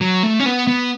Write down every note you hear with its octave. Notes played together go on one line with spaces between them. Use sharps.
F#3
A3
C#4
B3
B3